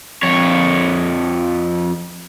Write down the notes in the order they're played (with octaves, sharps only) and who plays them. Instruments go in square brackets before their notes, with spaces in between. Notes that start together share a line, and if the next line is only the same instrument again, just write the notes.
[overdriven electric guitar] F2 C#5